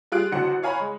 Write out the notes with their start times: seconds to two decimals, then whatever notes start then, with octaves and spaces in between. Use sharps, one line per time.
0.12 G3 F4 G#4 F#6 D7
0.32 A1 D3 F#3 C5 F#5 C#7
0.63 C#5 F5 G#5 A#5 B5
0.80 G#3